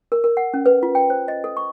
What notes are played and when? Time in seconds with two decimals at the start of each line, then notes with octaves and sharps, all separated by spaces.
0.12 A#4
0.24 A#4
0.37 F#5
0.54 C#4
0.66 B4
0.83 F4
0.95 G5
1.10 C5
1.28 D#5
1.44 A4
1.57 C#6